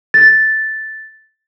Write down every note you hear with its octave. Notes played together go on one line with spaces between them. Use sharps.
A6